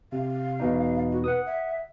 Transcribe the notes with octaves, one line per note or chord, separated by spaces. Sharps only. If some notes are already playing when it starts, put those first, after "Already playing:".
C3 F5
E2 B2 D#4
F#4
B4 F#5 D#6
E5